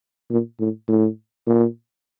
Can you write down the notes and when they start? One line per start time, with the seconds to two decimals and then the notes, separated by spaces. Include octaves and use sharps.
0.31 A#2
0.60 A2
0.89 A2
1.47 A#2